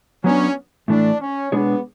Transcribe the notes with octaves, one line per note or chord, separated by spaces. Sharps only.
F#3 B3 C#4 D4
A2 E3 A3 D4
C#4
B2 G#3 B3 D4 G#4 C#5